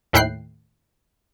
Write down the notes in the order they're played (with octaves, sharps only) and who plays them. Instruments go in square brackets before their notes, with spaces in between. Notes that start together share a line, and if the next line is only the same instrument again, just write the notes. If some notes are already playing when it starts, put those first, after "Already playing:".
[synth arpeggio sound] D#2 A2 E4 G5 F#6 C7